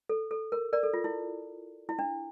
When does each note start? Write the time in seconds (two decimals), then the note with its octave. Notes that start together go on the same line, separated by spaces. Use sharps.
0.09 A4
0.31 A4
0.52 A#4
0.73 A#4 D5
0.83 A4
0.94 F4
1.04 E4
1.89 E4
1.99 D4